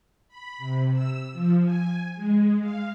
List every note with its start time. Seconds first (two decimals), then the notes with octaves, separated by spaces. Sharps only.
0.28 B5
0.58 C3
0.92 E6
1.32 F3
1.63 G#5
2.15 G#3
2.60 F5